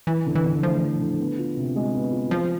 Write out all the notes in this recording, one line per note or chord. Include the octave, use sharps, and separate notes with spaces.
E3 E4
D3
E3
D3
F3 A3
E4
D3
B3
F4
C3
G#3
B3
F4
F3 F4